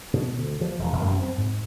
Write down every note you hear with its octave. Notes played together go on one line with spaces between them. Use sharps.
B2
D2
F3
E1
E1
F#2
C4
G#2